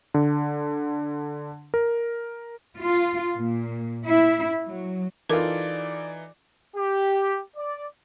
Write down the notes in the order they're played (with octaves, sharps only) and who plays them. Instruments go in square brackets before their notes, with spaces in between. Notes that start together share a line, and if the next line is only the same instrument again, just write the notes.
[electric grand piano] D3
A#4
[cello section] F4
A#2
E4
F#3
[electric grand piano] E3 D#4 D6 [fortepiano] F4 A4 [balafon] A#4 [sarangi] D5
[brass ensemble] G4
D5